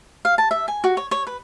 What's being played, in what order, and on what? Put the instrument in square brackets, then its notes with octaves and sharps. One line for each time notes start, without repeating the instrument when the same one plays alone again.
[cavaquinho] F5
A5
E5
G#5
F#4
C#5
C#5
B4